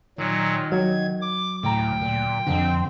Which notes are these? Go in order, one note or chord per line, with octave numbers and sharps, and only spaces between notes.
A#2 D#3 F#3
F#3 G#6
D6
D2 A2 G5 A#5
A#2
F2 D3 C4